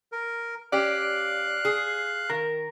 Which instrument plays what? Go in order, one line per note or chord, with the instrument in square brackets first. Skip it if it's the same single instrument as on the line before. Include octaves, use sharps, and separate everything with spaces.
[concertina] A#4
[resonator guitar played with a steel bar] C#4 G4 [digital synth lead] D5 [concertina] F5 F#6
[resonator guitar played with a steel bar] G#4
[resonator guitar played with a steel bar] D#3 [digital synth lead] A#4